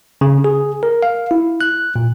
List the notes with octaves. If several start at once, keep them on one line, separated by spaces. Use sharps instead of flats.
C#3
G#4
A#4
F5
E4
F#6
A#2